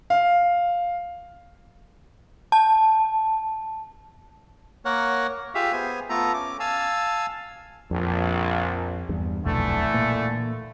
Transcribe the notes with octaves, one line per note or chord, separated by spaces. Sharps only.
F5
A5
A#3 A#4 C#5 F#5
F4 G4 G#4 E5 F5
B3 G#4 C5 G#5
A3 B3 F4 A4 A#5
C#4 D6
F5 G#5 A5 E6
A#1 F2
E2 G2
D#1 B1 F2 D3 E3 A3
A#2 A#3